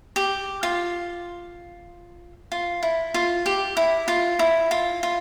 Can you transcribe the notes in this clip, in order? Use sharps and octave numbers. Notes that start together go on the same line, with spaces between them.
G4
F4
F4
E4
F4
G4
E4
F4
E4
F4
F4